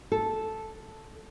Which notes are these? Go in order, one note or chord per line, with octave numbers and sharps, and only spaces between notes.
A4